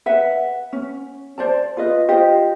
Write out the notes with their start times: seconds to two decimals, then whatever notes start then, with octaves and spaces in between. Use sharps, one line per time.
0.06 B4 E5 F#5
0.73 C#4
1.38 C5 D5 A5
1.77 F4 B4 D#5
2.08 F4 G4 C5 D#5